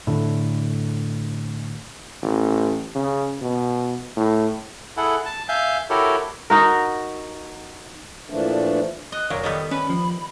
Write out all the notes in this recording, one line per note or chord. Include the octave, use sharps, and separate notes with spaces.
A2 D3
A1
C#3
B2
A2
E4 G#4 A4 F#5
A5
E5 F5 G#5 G6
E4 F#4 G4 A4 A#4 C#5
D#4 F#4 A#4
A#2 E3 F3 A3 D4
D#5 F#6
F1 A#2 F#3 A#4
D#3 G3 B3 A4
C#4 B4 B5
F3